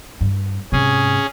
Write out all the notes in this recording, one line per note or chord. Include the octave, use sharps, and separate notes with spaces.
G2
G#2 C3 C#4 G#4